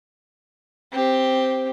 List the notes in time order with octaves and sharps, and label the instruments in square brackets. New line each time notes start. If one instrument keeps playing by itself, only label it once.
[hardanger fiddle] C4 G4